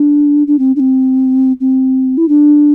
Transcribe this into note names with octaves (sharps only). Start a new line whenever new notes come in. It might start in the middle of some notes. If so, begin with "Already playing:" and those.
Already playing: D4
D4
C4
D4
C4
C4
E4
D4